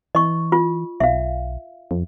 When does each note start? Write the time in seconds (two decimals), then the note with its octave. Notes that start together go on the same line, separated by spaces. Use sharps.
0.15 E3 D#5 C#6
0.52 F4
1.00 B1 E5 F5
1.91 F2